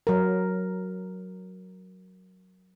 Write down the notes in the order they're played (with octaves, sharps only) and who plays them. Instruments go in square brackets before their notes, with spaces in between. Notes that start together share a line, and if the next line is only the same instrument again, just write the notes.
[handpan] F#3 A#4